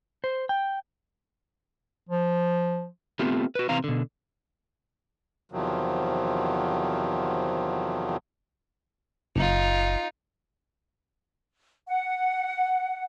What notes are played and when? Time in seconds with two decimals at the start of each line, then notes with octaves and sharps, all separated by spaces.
0.24 C5
0.49 G5
2.09 F3
3.19 A3 B3 C4 F4 G4
3.55 F#4 B4
3.69 C3 E3 C4 F5 A#5
3.84 B2 D3
5.52 E2 C3 D#3 F3 F#3
9.36 F#1 D#4 F4
11.87 F#5